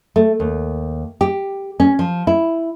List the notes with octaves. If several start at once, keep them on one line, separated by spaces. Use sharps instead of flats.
A3
D#2
G4
C#4
F3
E4